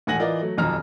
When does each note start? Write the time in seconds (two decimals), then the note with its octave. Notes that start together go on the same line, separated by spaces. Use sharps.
0.07 E1 A2 F#5 G#5 A#6 F#7
0.19 E3 F4 A#4 D5 D#5
0.41 F#3 A3
0.58 D#1 B1 F2 A#5 F6